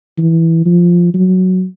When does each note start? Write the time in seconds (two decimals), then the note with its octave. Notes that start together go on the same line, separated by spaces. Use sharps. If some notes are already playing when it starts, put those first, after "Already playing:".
0.18 E3
0.66 F3
1.14 F#3